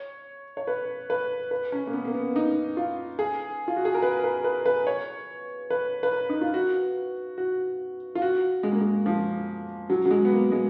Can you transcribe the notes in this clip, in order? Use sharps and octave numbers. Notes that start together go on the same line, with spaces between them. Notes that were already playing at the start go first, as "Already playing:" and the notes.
Already playing: C#5
C#5
B4
B4
B4
C#4
A#3
B3
A#3
B3
D#4
F4
G#4
F4
F#4
G#4
A#4
B4
B4
B4
B4
C#5
B4
B4
A#4
D#4
F4
F#4
F#4
F4
F#4
G#3
A#3
G#3
F3
F#3
F#3
G#3
B3
A#3
G#3